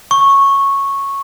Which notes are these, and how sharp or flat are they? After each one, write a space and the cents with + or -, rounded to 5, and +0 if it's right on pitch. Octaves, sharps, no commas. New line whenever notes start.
C#6 -10